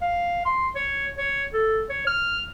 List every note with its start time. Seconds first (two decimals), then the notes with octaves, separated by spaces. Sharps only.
0.02 F5
0.45 C6
0.75 C#5
1.18 C#5
1.53 A4
1.90 C#5
2.07 F6